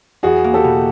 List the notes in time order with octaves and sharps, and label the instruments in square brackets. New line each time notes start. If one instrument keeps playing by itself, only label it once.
[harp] E2 [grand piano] F#4 G#4
[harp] A#3
[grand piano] G4 A4
[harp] B2